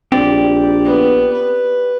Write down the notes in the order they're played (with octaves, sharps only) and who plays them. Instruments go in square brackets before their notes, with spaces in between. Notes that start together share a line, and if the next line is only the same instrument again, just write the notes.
[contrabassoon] A#1 [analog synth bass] C4 [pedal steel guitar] G4 D5
[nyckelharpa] B3
B4